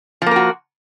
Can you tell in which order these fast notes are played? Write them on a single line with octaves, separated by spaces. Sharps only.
F3 A#3 A#4 F#4